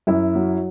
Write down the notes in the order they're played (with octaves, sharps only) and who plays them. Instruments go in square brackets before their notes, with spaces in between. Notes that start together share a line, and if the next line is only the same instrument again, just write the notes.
[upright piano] F#2 E4
F#3